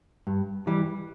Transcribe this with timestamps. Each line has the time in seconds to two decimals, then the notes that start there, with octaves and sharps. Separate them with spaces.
0.27 G2
0.67 E3 G3